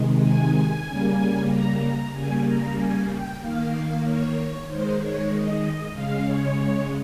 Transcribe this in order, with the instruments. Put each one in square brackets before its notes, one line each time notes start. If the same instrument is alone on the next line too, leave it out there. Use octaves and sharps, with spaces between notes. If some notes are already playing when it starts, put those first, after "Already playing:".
Already playing: [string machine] C3 D#3 G#3
G#5
G#5
C#3 G3 A#3
A#5
C#3 G3 A#3 G#5
A#5
G#5
G5
D#3 A#3 F5
F5
C#5
D#3 G#3 C5
C#5
D#5
C#3 G#3 F5
C#5